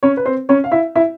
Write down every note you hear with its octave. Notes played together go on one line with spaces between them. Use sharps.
C#4 C#5
B4
C4 C5
C#4 C#5
F5
E4 E5
E4 E5